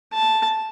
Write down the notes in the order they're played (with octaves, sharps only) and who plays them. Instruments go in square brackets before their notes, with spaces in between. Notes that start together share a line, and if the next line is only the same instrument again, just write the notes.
[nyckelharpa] A5